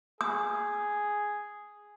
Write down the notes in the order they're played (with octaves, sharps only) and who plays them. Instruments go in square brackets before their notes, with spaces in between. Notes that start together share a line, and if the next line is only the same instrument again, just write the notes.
[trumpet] G#4 [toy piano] D#6